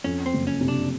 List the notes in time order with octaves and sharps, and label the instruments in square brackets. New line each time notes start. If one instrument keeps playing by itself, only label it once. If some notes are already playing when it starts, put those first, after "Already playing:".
[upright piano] F2 [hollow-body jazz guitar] C#4
[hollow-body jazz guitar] C4
[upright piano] F#1
[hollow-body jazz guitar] C#4
[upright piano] C3
[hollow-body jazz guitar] D4